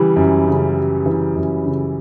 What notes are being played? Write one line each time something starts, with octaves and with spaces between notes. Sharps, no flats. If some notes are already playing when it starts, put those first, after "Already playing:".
Already playing: C#3 E3 G3
F#2
C#3
G3
E3
F#2
C#3